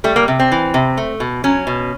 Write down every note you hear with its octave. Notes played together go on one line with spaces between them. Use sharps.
G3 A3
A#3
C3
C4
E3
C3
A3
B2
F#3 C#4
B2